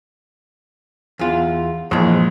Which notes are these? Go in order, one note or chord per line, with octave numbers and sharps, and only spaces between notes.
E2 F4
A#1 E3 G#3